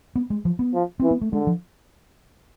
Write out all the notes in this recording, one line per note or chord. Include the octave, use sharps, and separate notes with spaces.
B3
G#3
F3
B3
F3
E3 C4
B3
A3
D3 G#3
F3